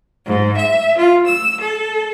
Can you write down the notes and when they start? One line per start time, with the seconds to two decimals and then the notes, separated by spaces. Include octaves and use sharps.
0.25 G#2
0.56 E5
0.96 F4
1.26 E6
1.60 A4